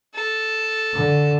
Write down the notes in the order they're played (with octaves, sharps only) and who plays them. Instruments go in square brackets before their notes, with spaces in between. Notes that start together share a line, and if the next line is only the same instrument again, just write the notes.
[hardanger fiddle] A4
[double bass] D3